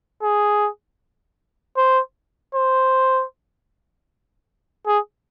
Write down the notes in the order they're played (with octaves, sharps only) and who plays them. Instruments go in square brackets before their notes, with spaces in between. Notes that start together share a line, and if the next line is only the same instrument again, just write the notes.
[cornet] G#4
C5
C5
G#4